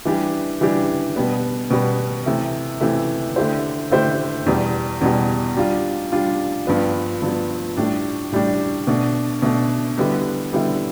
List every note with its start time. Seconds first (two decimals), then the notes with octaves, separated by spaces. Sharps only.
0.05 E3 G3 D4 G4
0.61 E3 G3 D4 G4
1.16 B2 G3 B3
1.70 B2 G3 B3
2.26 C3 E3 A3
2.81 C3 E3 A3
3.36 D3 A3 E4 G4 C5
3.91 D3 A3 E4 G4 C5
4.46 E2 B2 G3
5.01 E2 B2 G3
5.57 G3 D4 F4
6.12 G3 D4 F4
6.67 G2 F3 B3
7.22 G2 F3 B3
7.77 A2 G3 D4
8.32 A2 G3 D4
8.87 B2 A3 D4
9.42 B2 A3 D4
9.98 D3 G3 B3 E4
10.53 D3 G3 B3 E4